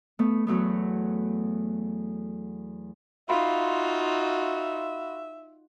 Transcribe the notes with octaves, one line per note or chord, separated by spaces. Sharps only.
A3 B3
E2 F#3 A3 B3
D#4 F4 F#4 E5 F5 B5 C6